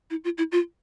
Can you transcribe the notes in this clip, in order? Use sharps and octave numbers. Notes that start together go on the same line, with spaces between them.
E4
F4
E4
F4